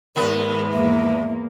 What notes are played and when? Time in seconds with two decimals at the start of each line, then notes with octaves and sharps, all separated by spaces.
0.16 D#2 G#2 G#3 B3 A#4 B4
0.73 E2 A#3 E5